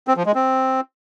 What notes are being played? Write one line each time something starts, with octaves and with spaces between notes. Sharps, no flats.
C4
F3
G#3
C4